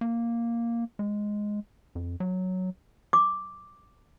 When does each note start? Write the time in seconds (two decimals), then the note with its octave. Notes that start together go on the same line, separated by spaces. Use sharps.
0.01 A#3
0.99 G#3
1.95 F2
2.20 F#3
3.13 D6